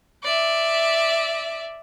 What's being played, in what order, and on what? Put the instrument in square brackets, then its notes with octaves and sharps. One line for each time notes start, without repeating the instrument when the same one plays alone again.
[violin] D5 E5